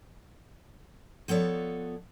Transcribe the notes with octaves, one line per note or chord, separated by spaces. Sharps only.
F3 B3 A4 C#5 D5